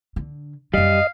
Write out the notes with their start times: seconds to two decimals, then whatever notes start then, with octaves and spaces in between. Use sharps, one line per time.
0.16 D3
0.74 F#2 G3 D#4 D#5 F5